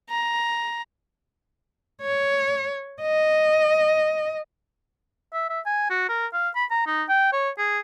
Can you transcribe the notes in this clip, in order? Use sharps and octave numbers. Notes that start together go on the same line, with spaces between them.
A#5
C#5
D#5
E5
E5
G#5
F#4
A#4
F5
B5
A#5
D#4
G5
C#5
G#4